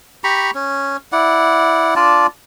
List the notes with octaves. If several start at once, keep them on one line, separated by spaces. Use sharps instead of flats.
G4 A#5 B5 C#6
C#4
E4 D5 F#5
D4 F4 D5 A5